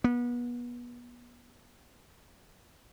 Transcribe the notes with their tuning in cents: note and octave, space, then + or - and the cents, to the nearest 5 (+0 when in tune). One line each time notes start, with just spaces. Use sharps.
B3 -30